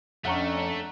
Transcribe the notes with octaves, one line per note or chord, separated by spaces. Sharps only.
F2 A3 C#4 D4 F#5 A#5 C#6